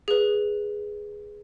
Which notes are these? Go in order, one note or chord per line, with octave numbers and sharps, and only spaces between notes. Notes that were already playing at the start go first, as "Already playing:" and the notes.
G#4 B4